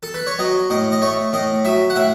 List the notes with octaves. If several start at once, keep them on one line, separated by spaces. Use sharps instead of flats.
A4
B4
C#5
F#3 D#5
A2 D#5
D#5
A3 C#5
A2 D#5
F#3 E5
F#5
A2 E5